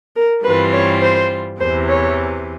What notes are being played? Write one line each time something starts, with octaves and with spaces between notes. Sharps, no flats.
A#4
G2 E3 G3 C4 F4 B4
C#5
C5
E2 C3 E3 C5
C#5